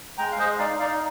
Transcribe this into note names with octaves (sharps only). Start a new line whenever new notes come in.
G#3 G5 A#5
F5
G#3 C5 D#5
D#4 D5 F5
D#4 D5 F5